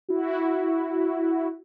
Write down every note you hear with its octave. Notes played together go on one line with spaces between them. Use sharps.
E4 F#4